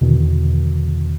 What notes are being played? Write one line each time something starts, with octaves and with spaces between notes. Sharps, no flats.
E2 B2 D3 D#3